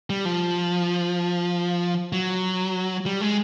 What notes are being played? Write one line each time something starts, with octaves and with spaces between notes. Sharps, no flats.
G3
F3
F#3
G3
G#3